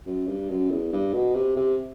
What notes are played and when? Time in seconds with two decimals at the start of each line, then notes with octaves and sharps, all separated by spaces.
0.06 F#2
0.27 G2
0.49 F#2
0.71 E2
0.92 G2
1.13 B2
1.35 C3
1.56 C3